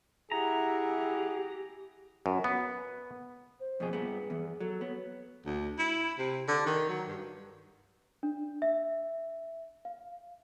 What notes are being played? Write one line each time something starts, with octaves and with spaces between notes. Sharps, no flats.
E4 G4 G#4 E5 F#5 A#5
F#2
B3
C5
F2 B2 G#4
G2 B3 G#4
E2
F#3 A4
B3 C#5
D2
E4
C3
D3
D#3
F#3
G2
D4
E5
F5